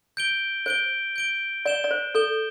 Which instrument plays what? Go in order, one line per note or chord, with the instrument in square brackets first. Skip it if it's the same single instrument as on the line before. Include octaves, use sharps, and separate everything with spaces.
[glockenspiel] G6 D7 G7
[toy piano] C5 [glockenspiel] G6 D7 G7
[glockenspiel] G6 D7 G7
[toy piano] D5 [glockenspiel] G6 E7 G7
[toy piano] D5
C5
[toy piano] A4 [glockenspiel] G6 E7 G7